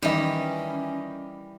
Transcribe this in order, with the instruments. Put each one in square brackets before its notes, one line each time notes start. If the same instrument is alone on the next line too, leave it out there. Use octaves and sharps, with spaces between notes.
[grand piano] D#3 D#5 [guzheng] E3 G3 [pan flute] C#4